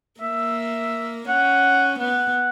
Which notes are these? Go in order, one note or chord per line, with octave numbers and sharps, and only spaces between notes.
A#3 E5
C#4 F#5
B3 F#5